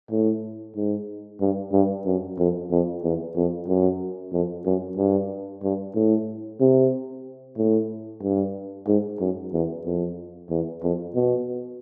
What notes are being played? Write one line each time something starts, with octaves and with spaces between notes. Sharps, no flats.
A2
G#2
G2
G2
F#2
F2
F2
E2
F2
F#2
F2
F#2
G2
G2
A2
C3
A2
G2
G#2
F#2
E2
F2
E2
F2
B2